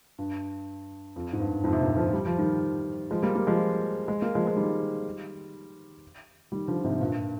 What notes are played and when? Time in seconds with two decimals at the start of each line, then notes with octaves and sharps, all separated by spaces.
0.18 G2
1.16 F2
1.33 G#2
1.40 G2
1.64 F2 G#2
1.73 C3
1.80 G2 A#2
1.97 D3 F3
2.13 G3
2.26 F3
2.39 D#3 G3
3.11 F3 G#3
3.23 G3 A#3
3.35 G3 A#3
3.47 F3 G#3
4.08 G#3
4.22 A#3
4.35 F3 G#3
4.47 G#3
4.57 D#3 G3
6.52 D#3 G3
6.68 D3 F3
6.84 G#2 C3
7.00 G2 A#2